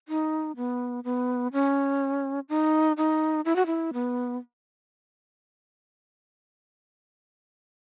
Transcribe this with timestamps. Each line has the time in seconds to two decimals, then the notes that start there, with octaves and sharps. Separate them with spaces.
0.08 D#4
0.57 B3
1.04 B3
1.53 C#4
2.49 D#4
2.97 D#4
3.45 E4
3.56 F#4
3.66 E4
3.94 B3